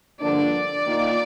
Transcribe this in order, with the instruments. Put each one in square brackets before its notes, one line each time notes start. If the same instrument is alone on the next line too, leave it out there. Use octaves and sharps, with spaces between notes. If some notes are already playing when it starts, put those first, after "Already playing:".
[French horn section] G2 D3 F3 A#3 D4 [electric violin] D5
[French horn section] D#3 A#3 F4